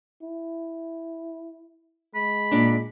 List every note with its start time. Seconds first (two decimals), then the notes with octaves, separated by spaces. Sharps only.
0.22 E4
2.15 G#3 B5
2.51 A#2 D4